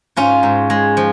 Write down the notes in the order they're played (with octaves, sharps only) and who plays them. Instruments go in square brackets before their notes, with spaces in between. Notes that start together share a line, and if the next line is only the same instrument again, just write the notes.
[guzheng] G#2 C#4 F4
G#2
G#3
F3